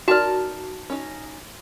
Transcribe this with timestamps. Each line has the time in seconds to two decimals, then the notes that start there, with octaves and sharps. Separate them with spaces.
0.08 D#4 F#4 A#4 D5 A5 F6
0.90 C#4 D#4